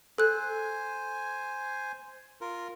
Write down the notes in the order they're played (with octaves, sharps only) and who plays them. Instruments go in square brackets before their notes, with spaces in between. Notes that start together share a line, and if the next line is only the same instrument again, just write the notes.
[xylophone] A4 F#6 [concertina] C5 G#5
[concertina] F4 A#4